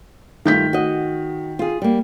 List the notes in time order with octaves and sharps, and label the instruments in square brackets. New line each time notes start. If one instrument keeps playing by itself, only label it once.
[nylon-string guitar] G2 A3 F4 [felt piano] D#3 G6 B6
[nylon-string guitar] F#4 D#5
F4 G#4
G3 A#3